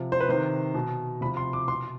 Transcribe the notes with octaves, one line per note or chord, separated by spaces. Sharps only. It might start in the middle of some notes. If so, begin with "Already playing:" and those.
Already playing: C3 F3
C5
B4
C3 D#3 C5
B2
C3 F3 B5
C6
D6
B2 C6